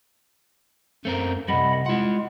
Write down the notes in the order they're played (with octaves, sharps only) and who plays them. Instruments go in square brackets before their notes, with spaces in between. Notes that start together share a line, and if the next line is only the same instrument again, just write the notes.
[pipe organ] F#2 [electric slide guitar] A3 C4 A#4
[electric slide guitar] C3 G3 [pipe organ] D#5 F#5 B5
[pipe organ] G#3 F4 [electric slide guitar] E4 F#5